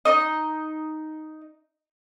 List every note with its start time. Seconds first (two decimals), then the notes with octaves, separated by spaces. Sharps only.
0.05 D#4 D#5